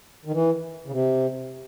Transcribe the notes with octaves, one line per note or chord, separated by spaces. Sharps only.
D#3
E3
C#3
C3